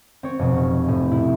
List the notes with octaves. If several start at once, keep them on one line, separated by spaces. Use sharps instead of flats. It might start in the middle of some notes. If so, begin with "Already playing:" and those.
C4 C#5
F1 B2
A2
E4